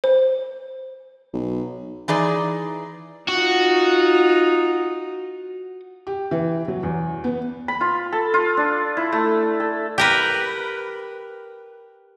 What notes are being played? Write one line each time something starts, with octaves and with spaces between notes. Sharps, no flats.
C5
B1
E3 D#4 G#4 D5
D#4 F4 F#4
G4
E3
F#3
E2
B3
B5
F4
A4
F4
D4
E4
A3
A4
G4 A#4 B4